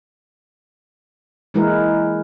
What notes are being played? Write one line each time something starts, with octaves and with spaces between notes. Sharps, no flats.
E3 G#3 A#3 E4 A#4 B4